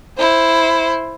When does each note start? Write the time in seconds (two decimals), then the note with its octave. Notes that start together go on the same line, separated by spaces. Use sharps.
0.18 E4 C5